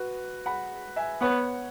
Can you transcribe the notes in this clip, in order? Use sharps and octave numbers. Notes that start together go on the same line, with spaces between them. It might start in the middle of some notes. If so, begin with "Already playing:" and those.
Already playing: F#4 B4
F#5 B5
E5 G#5
B3 C#5 F#5